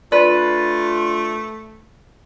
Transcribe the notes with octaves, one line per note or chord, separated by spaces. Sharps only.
A3 D4 F4 B4 D5